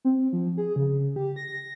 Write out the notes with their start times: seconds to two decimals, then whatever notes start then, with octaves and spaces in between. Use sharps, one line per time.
0.05 C4
0.33 F3
0.57 G#4
0.76 C#3
1.16 G4
1.36 A#6